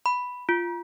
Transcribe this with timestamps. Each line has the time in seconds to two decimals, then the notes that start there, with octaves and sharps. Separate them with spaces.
0.06 B5
0.49 F4